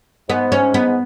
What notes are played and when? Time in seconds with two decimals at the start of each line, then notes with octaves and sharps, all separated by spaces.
0.29 G#2 B3
0.52 C#4
0.74 B3